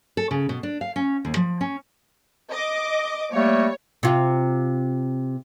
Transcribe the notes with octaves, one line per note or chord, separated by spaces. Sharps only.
A4
C#3
B2
D4
F5
C#4
D#2
F3
C#4
D#5 D6
G3 A3 A#3 C#5
C3 F4